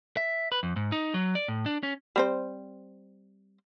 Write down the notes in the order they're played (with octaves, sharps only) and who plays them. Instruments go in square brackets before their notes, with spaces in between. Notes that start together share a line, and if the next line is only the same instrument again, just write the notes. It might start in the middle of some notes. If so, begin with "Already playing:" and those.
[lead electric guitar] E5
B4
F2
G#2
D#4
F#3
D5
A2
D4
C#4
[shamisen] G3 C4 C5